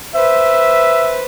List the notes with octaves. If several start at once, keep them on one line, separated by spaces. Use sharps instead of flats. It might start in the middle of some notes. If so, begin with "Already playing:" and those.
B4 C5 E5